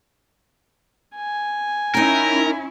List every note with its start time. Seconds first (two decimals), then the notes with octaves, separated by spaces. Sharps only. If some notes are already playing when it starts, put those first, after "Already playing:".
1.16 G#5
1.94 C#4 D#4 E4 A#4 G5